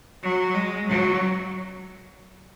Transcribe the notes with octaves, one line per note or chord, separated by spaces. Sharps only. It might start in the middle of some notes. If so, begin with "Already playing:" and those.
F#3
G#3
F#3